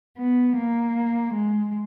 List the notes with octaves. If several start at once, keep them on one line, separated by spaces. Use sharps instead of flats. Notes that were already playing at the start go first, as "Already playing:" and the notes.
B3
A#3
G#3